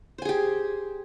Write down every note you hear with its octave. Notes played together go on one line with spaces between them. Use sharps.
G4 G#4 C5 G#5